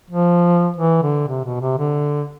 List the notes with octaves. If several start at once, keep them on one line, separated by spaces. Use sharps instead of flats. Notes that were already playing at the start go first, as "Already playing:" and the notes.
F3
E3
D3
C3
B2
C3
D3